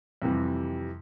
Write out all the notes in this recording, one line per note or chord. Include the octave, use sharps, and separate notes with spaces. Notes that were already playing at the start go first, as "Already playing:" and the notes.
F2 C3 E3 G3